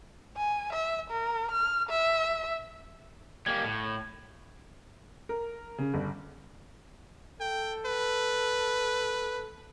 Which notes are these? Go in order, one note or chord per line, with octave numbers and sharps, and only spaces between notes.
G#5
E5
A#4
F6
E5
G3 A#3 G#6
A2
A#4
C#3
G1
A4 G5
B4